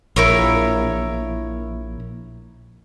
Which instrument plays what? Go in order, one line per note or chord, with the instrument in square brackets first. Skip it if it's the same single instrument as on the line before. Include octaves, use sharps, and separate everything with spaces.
[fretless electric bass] A#1 [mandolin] E4 A#4 C#5